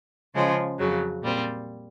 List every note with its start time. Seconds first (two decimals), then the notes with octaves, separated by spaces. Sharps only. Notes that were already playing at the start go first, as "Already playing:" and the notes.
0.34 C#3 F3 G#3
0.78 F2 C#3 F#3
1.22 A#2 G3 C4